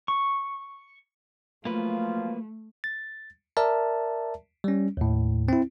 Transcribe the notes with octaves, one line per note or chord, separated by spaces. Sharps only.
C#6
F3 F#3 A3 A#3 F4 B4
A6
A#4 D5 E5 A5
G3 C#4
D#2 A2
C4 E4